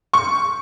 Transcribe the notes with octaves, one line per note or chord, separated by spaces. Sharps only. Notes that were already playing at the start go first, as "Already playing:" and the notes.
C#6